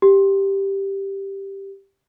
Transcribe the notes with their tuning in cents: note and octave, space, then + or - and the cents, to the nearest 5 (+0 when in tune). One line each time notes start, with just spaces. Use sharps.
G4 +0